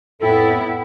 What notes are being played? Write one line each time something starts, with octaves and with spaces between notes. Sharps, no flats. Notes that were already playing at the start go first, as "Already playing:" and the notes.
F2 A2 B3 E4 A4 G5